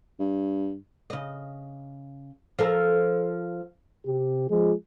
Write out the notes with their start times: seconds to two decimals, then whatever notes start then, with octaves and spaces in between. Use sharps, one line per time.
0.19 G2
1.10 C#3 D#5
2.59 F3 A4 A#4
4.07 C3 G4
4.50 F3 G#3